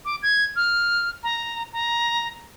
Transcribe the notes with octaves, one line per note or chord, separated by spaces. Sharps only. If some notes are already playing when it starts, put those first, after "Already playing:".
D6
G#6
F6
A#5
A#5